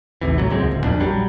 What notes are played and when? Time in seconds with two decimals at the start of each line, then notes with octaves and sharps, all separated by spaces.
0.21 A1 D#2 C3 E3
0.38 A2 F#3
0.50 C#2 F#2 G#3 C4
0.71 D1
0.84 F2 A#2 D4
1.00 A#1 F#3 G3